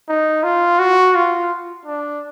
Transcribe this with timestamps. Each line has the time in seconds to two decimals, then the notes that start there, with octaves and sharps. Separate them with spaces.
0.09 D#4
0.43 F4
0.79 F#4
1.15 F4
1.86 D4